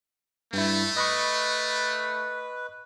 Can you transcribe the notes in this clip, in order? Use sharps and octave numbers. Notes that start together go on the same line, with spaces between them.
G2 A3 E4
B4 D#5 B5 C#6